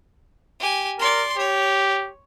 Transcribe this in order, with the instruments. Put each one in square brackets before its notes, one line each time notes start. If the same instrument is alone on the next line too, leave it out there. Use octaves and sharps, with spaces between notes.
[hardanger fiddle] G4 G#5
[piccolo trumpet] A#4 [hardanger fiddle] D5 C6
[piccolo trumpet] G4 [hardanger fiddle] C#5